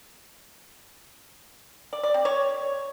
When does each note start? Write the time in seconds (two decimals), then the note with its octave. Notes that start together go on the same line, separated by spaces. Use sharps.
1.93 D5
2.03 D5
2.14 C4
2.25 C#5